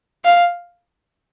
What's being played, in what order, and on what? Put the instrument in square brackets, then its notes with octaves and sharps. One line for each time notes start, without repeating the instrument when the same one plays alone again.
[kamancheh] F5